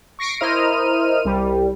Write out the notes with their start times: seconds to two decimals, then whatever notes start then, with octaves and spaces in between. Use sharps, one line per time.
0.19 C#6 A#6 C7 D7
0.40 E4 A#4 C5 D#5 F6 D#7
1.25 C2 G3